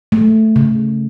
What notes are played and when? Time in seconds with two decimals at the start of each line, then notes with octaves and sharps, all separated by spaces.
0.12 A3
0.56 C#3